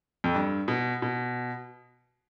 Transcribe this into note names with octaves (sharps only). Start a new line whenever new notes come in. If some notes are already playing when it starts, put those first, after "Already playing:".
F2
G2
B2
B2